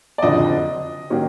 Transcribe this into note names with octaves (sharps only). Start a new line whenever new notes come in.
D5
F#1 F2 D3 F3 D#5
D#3 F#3 A#3 C#4